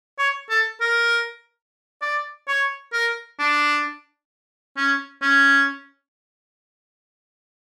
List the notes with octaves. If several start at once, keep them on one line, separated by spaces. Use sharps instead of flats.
C#5
A4
A#4
D5
C#5
A#4
D4
C#4
C#4